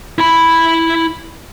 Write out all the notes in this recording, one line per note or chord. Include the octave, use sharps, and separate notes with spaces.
E4 B5